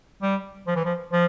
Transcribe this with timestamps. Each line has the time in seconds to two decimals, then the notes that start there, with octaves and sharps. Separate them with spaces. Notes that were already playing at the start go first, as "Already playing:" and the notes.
0.22 G3
0.67 F3
0.76 E3
0.85 F3
1.12 F3